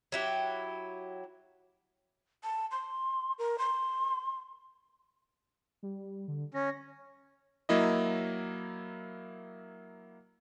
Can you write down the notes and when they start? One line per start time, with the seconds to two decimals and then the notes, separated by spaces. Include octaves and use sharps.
0.12 F#3 E4 G4
2.44 A5
2.71 C6
3.38 A#4
3.59 C6
5.83 G3
6.28 D3
6.54 C#4 A#6
7.69 F#3 A#3 E4 D#5